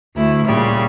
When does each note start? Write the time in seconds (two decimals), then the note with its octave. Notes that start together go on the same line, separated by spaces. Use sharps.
0.16 D2 A3 E4
0.46 A#2 C#3 G3